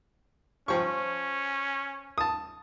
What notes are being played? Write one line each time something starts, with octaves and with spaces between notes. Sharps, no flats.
F3 C#4 G5 C#6
A5 D#6